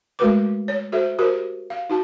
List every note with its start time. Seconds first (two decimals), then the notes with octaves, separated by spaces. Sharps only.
0.19 G#3 A3 F#4 A#4 B4 D6
0.68 C#5
0.92 F#4 A4 C5 E5
1.19 F#4 G4 A#4 C5
1.70 F5
1.90 D#4 F#4 A5